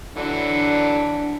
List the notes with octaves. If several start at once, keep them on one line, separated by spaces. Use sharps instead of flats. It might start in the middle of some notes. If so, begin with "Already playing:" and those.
D3 E3 F#3 D4